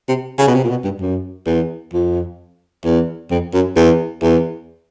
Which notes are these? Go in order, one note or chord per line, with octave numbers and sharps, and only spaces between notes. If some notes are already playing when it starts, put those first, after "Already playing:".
C3
C#3
B2
C3
A#2
B2
G2
F#2
E2
F2
E2
F2
F#2
E2
E2